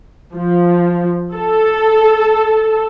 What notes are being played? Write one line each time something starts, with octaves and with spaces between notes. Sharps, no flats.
F3
A4